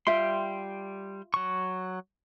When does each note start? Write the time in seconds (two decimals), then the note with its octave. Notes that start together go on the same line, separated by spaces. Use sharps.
0.07 G3 F4 E5 G5 C6
1.34 F#3 C#6